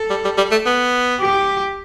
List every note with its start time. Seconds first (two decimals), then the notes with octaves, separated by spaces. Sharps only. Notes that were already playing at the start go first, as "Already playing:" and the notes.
Already playing: A4
0.10 G3
0.24 G3
0.38 G3
0.51 A3
0.66 B3
1.21 G4